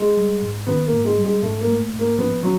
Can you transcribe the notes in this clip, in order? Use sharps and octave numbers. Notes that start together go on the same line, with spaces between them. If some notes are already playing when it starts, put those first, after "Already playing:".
Already playing: G#3
G3
G#2
D#3 B3
A#3
G#2
G#3
G3
G#3
G#2 A3
A#3
A3
G#2
A#3
F3 B3
F#3